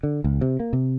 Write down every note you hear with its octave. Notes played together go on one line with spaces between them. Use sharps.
D3
C#2
C3
A#3
C3